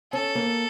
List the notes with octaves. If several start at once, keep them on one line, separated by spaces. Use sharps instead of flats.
C#4 A4
A#3